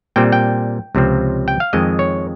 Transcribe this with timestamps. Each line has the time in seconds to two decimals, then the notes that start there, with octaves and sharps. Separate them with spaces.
0.16 A#2 G3 C4 G5
0.32 G5
0.95 C#2 C3 F3 C4
1.48 G5
1.60 F5
1.73 F2 D#3 G#3 C4 D#5
1.99 C#5